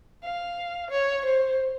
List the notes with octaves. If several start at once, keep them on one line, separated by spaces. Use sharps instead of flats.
F5
C#5
C5